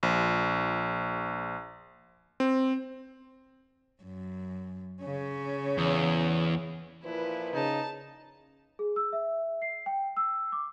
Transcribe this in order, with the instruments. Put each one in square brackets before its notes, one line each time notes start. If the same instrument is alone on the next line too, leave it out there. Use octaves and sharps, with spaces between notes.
[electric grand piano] A#1
C4
[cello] F#2
C#3 C#4
[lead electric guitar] E2
[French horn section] A#2 F3 B4 [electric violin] E4
[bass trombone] C#3 [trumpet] D#4 [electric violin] A5
[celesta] G#4
E6
E5
C7
G5
E6
D6